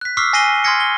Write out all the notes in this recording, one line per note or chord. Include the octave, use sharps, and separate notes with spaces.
F#6 B6
C#6 D6 E6 F6 B6 C7
G#5 A#6 C7 D#7 G7
C6 D#6 F6 G#6 A#6 C#7
G7